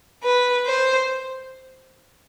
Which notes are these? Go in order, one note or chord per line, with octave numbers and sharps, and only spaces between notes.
B4
C5